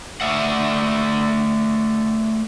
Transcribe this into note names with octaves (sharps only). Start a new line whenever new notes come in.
A3 D5 E5 F#5